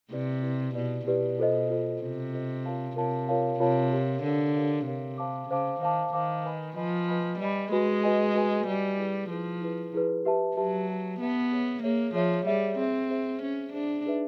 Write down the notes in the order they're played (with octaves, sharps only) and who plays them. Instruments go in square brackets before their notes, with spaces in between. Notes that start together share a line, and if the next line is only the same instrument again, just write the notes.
[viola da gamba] C3 [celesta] E4 G4 B4 D5
[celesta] E4 G4 B4 D5
[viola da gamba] B2 [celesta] E4 G4 B4 D5
[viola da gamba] B2 [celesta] E4 G4 B4 D5
[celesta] F4 A4 C5 D#5
F4 A4 C5 D#5
[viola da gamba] C3 [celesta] F4 A4 C5 D#5
[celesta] F4 A4 C5 D#5
F4 A#4 C#5 F5 A5
[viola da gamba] C3 [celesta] F4 A#4 C#5 F5 A5
[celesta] F4 A#4 C#5 F5 A5
[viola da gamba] C3 [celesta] F4 A#4 C#5 F5 A5
[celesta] G4 A#4 C#5 F5
[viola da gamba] D3 [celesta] G4 A#4 C#5 F5
[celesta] G4 A#4 C#5 F5
[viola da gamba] C3 [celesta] G4 A#4 C#5 F5
[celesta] C5 F5 A5 D6
[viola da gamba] C#3 [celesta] C5 F5 A5 D6
[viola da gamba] D#3 [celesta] C5 F5 A5 D6
[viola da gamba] D#3 [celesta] C5 F5 A5 D6
[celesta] B4 D#5 G#5 B5
[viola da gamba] F3 [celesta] B4 D#5 G#5 B5
[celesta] B4 D#5 G#5 B5
[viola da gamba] G3 [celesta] B4 D#5 G#5 B5
[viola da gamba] G#3 [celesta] F#4 B4 D#5 G#5
[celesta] F#4 B4 D#5 G#5
F#4 B4 D#5 G#5
[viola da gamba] G3 [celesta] F#4 B4 D#5 G#5
[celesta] E4 G#4 B4
[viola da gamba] F3 [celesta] E4 G#4 B4
[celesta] E4 G#4 B4
E4 G#4 B4
G4 B4 E5 A5
[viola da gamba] F#3 [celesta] G4 B4 E5 A5
[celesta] G4 B4 E5 A5
[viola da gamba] B3 [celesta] G4 B4 E5 A5
[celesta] G#4 C#5 E5
[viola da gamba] A#3 [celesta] G#4 C#5 E5
[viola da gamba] F3 [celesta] G#4 C#5 E5
[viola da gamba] G3 [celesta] G#4 C#5 E5
[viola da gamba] C4 [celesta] G#4 C5 E5
[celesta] G#4 C5 E5
[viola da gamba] C#4 [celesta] G#4 C5 E5
[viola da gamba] D4 [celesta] G#4 C5 E5
[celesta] D#4 G#4 B4 E5